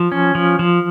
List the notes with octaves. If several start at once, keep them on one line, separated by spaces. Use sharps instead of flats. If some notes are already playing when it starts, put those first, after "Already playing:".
Already playing: F3
C#4
F3
F3